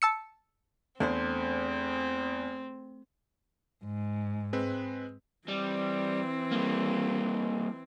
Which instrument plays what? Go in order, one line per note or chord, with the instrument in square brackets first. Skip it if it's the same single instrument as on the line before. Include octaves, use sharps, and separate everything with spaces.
[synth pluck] A5 E6 C#7
[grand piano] E2 [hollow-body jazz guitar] A3 D4 C5 [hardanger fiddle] C4
[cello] G#2
[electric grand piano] G#3 C4 B4
[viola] E3 C4 [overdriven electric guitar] G3
[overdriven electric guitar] G3 A#3